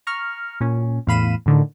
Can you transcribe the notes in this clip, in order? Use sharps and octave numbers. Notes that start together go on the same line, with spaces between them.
A#5 C#6 F6
A#2 C#4
E2 A2 F5 B5 D#7 E7
A2 D3 D#3